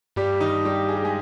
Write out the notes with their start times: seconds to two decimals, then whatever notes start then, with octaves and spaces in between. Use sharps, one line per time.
0.16 G2 G3 G4
0.41 D#3 D#4
0.65 G3 G4
0.89 G#4
0.96 G4
1.04 G#3 G#4